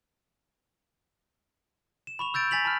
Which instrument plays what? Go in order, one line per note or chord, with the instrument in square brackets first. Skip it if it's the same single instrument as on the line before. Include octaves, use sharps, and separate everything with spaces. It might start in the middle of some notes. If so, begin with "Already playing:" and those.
[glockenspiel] E7
B5 C#6 F7
E6 G6 A6 D7
G#5 A6 B6 F7 F#7
A5 B5 F6